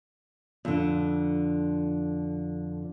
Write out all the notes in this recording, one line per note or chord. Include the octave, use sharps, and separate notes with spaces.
F2 D3